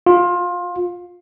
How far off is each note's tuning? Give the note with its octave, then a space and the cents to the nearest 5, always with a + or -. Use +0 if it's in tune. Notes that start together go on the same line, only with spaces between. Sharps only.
F4 +20